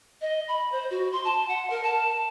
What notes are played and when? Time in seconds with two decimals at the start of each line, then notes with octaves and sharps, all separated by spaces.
0.21 D#5
0.48 B5
0.71 C5
0.90 F#4
1.12 C6
1.24 A5
1.48 F#5
1.70 A#4
1.83 A5